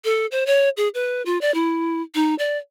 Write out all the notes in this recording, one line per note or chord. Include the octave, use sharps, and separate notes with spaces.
A4
C5
C#5
G#4
B4
F4
D5
E4
D#4
D5